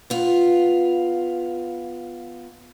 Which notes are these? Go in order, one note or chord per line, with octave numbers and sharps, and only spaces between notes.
B3 F4